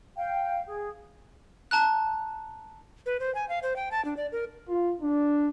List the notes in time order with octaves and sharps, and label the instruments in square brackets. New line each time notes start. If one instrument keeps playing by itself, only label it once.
[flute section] F5 G5
G#4
[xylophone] A5 A#5 F#6
[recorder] B4
C5
G#5
F5
C5
G5
A5
D4
D5
A#4
[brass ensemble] F4
D4